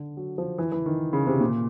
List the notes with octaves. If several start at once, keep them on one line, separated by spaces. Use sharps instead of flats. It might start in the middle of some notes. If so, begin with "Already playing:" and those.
Already playing: D3
F#3
F3
E3
E3
D#3
C#3
C3
A#2